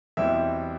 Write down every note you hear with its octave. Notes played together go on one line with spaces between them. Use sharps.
E2 B2 G3 C4 E4 E5